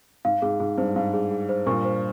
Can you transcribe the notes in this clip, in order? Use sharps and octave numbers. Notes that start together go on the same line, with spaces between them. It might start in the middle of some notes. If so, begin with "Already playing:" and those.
G#2 F5
G#2 G#4
G#2 G#4
G2 C5
G#2 F5
G#4
G#4
C5
G2 A#2 C#6
C5